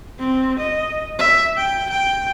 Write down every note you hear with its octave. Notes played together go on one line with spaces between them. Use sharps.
C4
D#5
E5
G5
G5